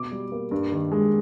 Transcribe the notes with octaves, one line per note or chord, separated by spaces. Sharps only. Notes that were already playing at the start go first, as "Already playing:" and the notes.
Already playing: B2 D6
G3
A#3
G2
D#3
G#3